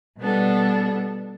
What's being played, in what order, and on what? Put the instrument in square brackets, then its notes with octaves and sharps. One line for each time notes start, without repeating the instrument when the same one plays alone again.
[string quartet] B2 G3 B3 D4 A4